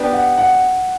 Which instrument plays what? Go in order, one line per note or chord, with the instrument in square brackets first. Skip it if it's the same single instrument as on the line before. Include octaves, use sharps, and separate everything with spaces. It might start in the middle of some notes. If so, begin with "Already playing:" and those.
Already playing: [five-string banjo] B3 D4 G4 B4
[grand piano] F#5
F#5